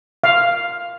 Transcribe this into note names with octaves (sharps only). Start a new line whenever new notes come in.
F5